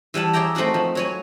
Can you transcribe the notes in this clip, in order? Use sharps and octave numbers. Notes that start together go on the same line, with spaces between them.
E3 G3 F#5 A5
G#4 C#5 D5 E5 G5 A#5
A3 C4 D#4 F#4 A#4
F3
F#3 C#5 G#5